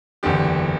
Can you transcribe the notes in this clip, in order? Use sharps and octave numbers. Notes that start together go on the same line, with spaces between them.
F#1 E2 D3 G4